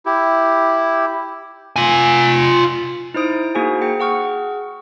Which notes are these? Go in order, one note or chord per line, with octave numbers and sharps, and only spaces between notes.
E4 G4
F4 G#5
D#4 E4 C5 D#6 D7
A#3 D#4 F#4 G#4 C5 G#5
G#4 G5 C#7
G#4 F#5 C#6 F6